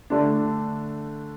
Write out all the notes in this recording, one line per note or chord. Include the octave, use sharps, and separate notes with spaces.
D3 A3 D4